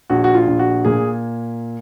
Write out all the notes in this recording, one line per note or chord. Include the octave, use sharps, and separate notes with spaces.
A#1 F#4
F#4
F4
A#1
F#4
A#2 G#4